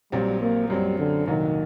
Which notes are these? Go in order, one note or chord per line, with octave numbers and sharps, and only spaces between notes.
A#1 A#2 F#3 G3 C4 G4
A#3
F#2 F#3 G3 C4
D3
C2 A#2 D#3 F#3